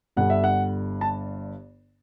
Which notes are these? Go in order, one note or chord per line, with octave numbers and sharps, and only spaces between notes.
G1 G2 D3 F#5
E5
F#5
A5